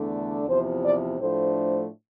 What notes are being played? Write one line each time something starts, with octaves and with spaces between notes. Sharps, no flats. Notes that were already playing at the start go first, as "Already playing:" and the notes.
Already playing: E2 D3 A3 D4
E2 C3 F3 C5
D5
A2 F3 A3 D4 C5